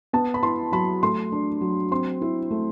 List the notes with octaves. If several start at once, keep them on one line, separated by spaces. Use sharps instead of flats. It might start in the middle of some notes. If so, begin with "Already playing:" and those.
B3 A5
B5
E4 C6
F#3 B5
A3 C6
D4
F#3
C4 C6
E4
A3